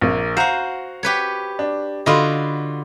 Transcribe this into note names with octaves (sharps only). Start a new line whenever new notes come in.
A#1 A#3
F#4 C5 F5 F#5 A#5
G4 B4 C#5
D4
D3 F4 F#4 D#5 B5 C6